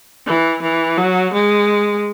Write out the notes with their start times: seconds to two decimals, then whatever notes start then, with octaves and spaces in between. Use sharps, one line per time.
0.27 E3
0.63 E3
0.98 F#3
1.33 G#3